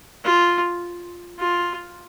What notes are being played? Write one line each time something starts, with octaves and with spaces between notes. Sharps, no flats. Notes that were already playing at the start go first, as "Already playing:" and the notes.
F4
F4